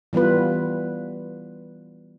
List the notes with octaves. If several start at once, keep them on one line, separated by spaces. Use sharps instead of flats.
E3 G3 B3 F4 B4